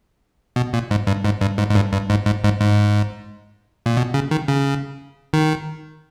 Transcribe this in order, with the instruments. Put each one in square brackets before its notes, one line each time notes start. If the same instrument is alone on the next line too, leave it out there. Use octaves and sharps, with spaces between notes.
[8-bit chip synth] B2
A#2
G#2
G2
G#2
G2
G#2
G#2
G2
G2
G#2
G#2
G#2
G#2
A#2
B2
C#3
D#3
C#3
D#3